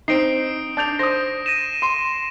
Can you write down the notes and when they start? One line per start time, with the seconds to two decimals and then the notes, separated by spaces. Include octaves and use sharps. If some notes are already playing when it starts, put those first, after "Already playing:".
0.08 C4 D#4 C7 D7
0.77 D4 G6 F7
0.99 C5 D#6 A#6
1.46 A#6 D#7 E7
1.82 C6